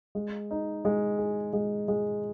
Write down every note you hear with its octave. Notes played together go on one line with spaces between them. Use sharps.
G#3
D#4
G#3
G#4
G#3
G#3